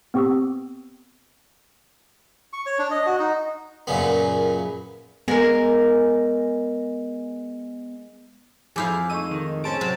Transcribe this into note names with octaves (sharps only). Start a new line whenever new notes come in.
B3 C4 G4 C#6 D#6 E6
C#6
C#5
D4
D#5
F#4
D#4
F#2 A#2 C#3 B3
G#3 B3 A#4
F2 E4 G#4 F5 G#5 D6 G6
G#3 A3 D#4 C#6 E6 D#7
D#3
G#3 C4 C#4 A5 D7
C3 F#3 A5